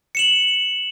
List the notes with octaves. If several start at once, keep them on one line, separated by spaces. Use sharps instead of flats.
C#7 E7 F#7